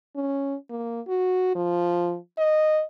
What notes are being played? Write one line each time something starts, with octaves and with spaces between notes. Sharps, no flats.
C#4
A#3
F#4
F3
D#5